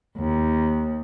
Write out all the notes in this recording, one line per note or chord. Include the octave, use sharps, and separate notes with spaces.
D#2